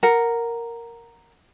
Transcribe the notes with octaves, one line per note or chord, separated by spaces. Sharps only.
A#4 F#5